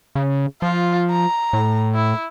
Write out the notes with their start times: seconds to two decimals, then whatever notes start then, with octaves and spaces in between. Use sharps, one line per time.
0.15 C#3
0.62 F3 F4
1.11 A#5
1.53 A2
1.95 E4